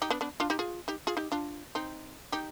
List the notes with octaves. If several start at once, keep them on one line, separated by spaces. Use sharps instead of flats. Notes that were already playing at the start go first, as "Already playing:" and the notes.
D#4 G4
B3 D4
B3 D4
D4 F4
D#4 G4
F4 G#4
D#4 G4
F4 G#4
D#4 G4
D4 F4
C4 D#4
D#4 G4